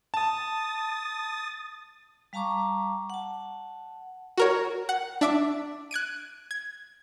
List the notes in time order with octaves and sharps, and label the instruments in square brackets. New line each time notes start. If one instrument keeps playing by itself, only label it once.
[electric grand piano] A5 [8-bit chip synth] D#6 A6
[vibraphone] G3 F5 A5 A#5 C#6 D6
F#5 A5
[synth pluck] F#4 A#4 C#5
F#5
D4 E5 D6
F#6 G#6 D7 D#7
G#6